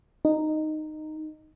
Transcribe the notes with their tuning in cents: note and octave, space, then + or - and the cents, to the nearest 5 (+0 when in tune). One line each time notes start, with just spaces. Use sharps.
D#4 -10